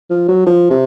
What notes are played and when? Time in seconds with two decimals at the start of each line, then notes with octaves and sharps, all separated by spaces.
0.10 F3
0.28 F#3
0.46 F3
0.70 C3